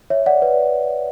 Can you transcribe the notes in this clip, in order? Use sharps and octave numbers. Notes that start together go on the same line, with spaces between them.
C#5 E5
D5 F#5
B4 D5